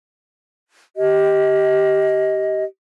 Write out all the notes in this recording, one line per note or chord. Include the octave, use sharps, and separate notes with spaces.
G4 D#5